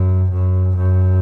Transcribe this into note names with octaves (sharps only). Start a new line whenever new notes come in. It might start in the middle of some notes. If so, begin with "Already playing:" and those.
Already playing: F#2
F#2
F#2